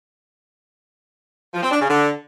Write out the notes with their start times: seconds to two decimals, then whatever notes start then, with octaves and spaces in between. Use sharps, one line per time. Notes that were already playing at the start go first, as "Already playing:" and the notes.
1.54 F3
1.63 C4
1.71 D4
1.80 C#3
1.88 D3